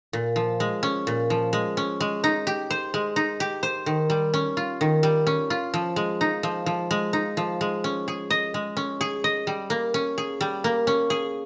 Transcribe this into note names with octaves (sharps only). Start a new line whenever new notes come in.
A#2
F3
G#3
C#4
A#2
F3
G#3
C#4
G#3
D#4
G4
C5
G#3
D#4
G4
C5
D#3
G3
C#4
F4
D#3
G3
C#4
F4
F3
G#3
D#4
F3
F3
G#3
D#4
F3
G#3
C#4
G#4
D#5
G#3
C#4
G#4
D#5
G3
A#3
C#4
G#4
G3
A#3
C#4
G#4